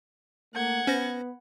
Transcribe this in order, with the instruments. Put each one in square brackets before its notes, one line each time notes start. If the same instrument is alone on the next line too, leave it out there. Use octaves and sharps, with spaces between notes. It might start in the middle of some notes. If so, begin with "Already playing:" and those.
[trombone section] A3 A#3 [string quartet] F#5 G#6
[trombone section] B3 B4 [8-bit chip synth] C#4 C5 A#6